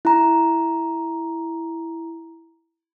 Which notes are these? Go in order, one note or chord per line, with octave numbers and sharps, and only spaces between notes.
E4 A#5